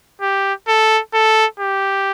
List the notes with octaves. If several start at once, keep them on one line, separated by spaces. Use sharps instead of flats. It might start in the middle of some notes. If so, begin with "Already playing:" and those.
G4
A4
A4
G4